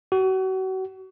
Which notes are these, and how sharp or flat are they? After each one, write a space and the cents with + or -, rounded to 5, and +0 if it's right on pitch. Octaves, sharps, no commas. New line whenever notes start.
F#4 +35